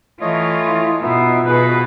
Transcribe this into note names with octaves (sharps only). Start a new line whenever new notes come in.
E3 A3 F4 C#5 D#5
E4
B2 B3 D#4 F4 E5
B2 G#4 B4 B5